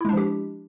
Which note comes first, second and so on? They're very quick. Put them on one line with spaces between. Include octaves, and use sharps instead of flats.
E4 G#3 D4 F3 G4